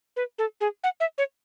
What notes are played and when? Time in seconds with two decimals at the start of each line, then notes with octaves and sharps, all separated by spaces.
0.16 B4
0.38 A4
0.61 G#4
0.84 F#5
1.00 E5
1.18 C#5